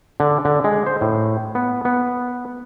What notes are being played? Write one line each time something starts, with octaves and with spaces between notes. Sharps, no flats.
D3
D3
G#3
C5
A2
B3
B3